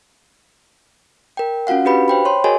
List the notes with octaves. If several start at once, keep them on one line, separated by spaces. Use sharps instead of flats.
A#4 G5
C#4 F4 F#4 F5 F#5
D4 F#4 G4 B4 F5 B5
C5 G5 B5
C#5 C6
F#4 G#4 A#4 C#5 D#5 G#5